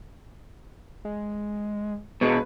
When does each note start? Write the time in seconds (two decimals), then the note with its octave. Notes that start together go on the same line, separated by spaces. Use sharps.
1.05 G#3
2.21 B2 G#3 B4